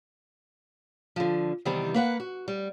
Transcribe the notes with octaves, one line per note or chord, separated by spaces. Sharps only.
D3 F3
C3 D#3 E3 G3 B3 C4
A#3 B4 F#5
F#4
G3